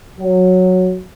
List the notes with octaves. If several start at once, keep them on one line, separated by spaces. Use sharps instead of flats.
F#3